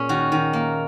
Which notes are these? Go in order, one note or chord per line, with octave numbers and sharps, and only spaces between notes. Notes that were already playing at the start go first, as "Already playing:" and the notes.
Already playing: A#2 C#4 G#4
D#3 F#4
D#3
A#3